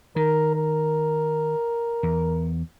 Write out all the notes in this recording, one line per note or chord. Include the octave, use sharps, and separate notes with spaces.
D#3 A#4
A#4
E2